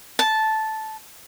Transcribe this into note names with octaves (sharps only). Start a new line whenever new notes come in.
A5